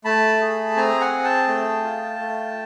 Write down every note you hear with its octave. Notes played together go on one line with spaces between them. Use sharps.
A3 A5 B5
G#4
C4 G#5 A#5
F#5 G#5
G#4
G5 A5
A3
F4
A3